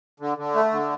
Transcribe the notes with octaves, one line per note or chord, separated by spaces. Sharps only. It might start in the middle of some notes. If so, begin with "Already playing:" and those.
D3
D3
A3
D3